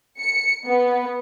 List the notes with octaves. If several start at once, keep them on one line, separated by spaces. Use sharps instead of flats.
C#7
B3